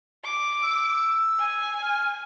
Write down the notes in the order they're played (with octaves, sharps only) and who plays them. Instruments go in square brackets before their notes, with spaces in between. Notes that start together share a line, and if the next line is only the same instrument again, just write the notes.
[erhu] D6
[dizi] E6
[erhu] G#5
[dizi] F6